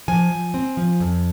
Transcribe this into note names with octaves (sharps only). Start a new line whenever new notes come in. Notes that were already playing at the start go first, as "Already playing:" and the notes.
F3 G#5
F3
C4
F3
F2